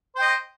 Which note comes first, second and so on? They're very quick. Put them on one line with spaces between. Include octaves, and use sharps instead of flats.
C5 G5 D#5